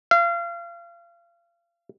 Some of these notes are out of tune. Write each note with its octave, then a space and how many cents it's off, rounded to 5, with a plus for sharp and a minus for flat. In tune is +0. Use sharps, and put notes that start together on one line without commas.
F5 -30